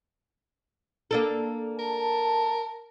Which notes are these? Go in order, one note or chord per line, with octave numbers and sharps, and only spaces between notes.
A#3 D4 A4
A#4 A5